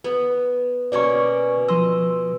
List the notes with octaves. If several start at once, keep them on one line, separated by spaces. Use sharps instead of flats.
B3
B2 A#3 C#4 D5 C#6
F3 D#5 C6 E6